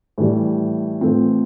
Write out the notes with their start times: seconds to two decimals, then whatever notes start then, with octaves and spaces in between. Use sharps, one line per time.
0.18 A2 E3 G3
1.01 A2 E3 A3 C4 F4